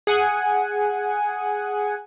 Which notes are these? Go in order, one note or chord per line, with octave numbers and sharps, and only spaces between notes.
G#4 F#5 G#5